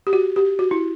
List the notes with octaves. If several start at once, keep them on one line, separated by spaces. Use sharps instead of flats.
G4
F#4
G4
F#4
E4